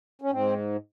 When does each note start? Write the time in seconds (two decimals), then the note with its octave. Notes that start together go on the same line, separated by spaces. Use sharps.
0.22 C#4
0.31 G#2 C4